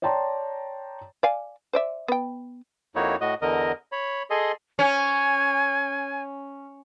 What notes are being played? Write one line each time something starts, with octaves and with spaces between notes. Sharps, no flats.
C#5 D5 G5 A5 A#5 C6
D5 F5 G#5
C5 D5 E5
B3 G5
F2 A#3 D#4 E4 F#4 C#5
A2 F#4 D#5
E2 D3 A#4 D#5
C#5 B5
G#4 A4 D#5 C6
C#4 G#5